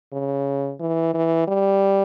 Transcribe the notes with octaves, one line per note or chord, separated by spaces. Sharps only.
C#3
E3
E3
G3